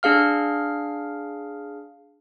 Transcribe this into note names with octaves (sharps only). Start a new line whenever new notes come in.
D4 G#4 F5 F6